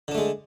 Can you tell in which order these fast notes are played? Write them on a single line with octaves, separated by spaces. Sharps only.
D3 D4 A3 G#3